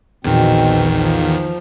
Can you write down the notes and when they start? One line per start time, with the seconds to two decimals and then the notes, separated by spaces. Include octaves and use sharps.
0.24 A#1 E2 B2 D#3 C4
0.95 F3